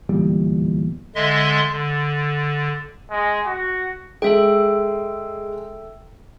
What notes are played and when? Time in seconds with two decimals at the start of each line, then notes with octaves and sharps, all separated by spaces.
0.09 D1 E2 A#2 G3
1.15 D3 G#3 D#5 E5 C6
1.72 D3
3.11 G#3
3.46 F#4
4.22 G#3 A4 E5 G5